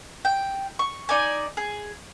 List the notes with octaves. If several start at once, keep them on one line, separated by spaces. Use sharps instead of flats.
G5
C#6
D#4 D5 G#5
G#4